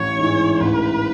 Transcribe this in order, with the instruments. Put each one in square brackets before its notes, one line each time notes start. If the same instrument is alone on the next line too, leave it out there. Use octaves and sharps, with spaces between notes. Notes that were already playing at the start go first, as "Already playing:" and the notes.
Already playing: [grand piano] A1 [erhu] C#5
[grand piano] G#2 E3
[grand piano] A1 [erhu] B4